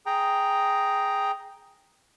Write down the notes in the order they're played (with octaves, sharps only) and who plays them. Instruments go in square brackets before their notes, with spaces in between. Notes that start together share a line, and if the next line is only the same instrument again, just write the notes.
[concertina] G#4 G5 A#5